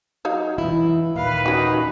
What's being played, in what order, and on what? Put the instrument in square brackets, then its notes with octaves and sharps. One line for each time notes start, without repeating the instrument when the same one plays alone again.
[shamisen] F#3 D#4 F5
[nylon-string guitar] E3 E4
[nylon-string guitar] D#2 A#2 [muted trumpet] B4 [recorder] F5
[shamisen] C#4 F#4 [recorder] D#4